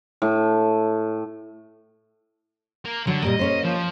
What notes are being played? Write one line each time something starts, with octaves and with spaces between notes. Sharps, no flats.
A2
A#3
D3 F#3
A#2 G3 A#3 D#5
A#3 C#4 C5
F3